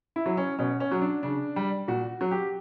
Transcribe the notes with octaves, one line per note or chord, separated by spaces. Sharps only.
E4
F#3
C#4
B2 C#4
C#4
F#3
D4
C#3 D4
G3
A#2 F#4
F#3
G4